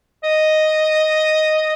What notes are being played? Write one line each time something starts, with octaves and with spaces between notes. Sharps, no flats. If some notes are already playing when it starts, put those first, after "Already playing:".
D#5